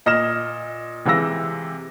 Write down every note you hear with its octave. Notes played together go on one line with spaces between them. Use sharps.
A#2 D#5 F6 A#6 E7
C3 E3 G#3 F5 E6 A#6